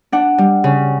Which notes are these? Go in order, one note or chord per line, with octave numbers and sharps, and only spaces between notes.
D4 F#5
G3
C#3